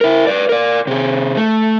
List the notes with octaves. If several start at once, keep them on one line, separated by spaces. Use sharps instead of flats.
E4 A#4
B4 D5
A#4 D5
C3 G#4
A3